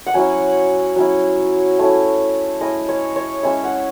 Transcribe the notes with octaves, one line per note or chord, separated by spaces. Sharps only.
F#5
F#3 C#4 E4 G#5
F#3 C#4 E4
A3 C#4 E4
G#3 C#4 E4 D#5
C#5
C#5
G#3 C#4 E4 E5
F#5